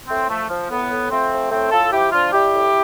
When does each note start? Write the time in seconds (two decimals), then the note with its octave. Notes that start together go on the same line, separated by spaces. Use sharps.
0.08 A2 A3 C4
0.30 F3 A3
0.49 F3
0.70 A2 B3
0.90 A2
1.11 F3 A3 C4
1.32 F3
1.51 A2 A3 C4
1.71 A2 F4 A4
1.92 F3 E4 G4
2.12 F3 D4 F4
2.32 G3 E4 G4
2.53 A2